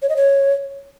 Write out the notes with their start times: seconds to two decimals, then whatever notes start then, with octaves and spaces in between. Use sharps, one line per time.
0.02 C#5
0.09 D#5
0.16 C#5